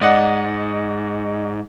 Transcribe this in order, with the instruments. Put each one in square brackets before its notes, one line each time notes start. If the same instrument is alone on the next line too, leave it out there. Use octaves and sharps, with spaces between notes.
[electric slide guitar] G#2 [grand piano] D5 D#5 F#5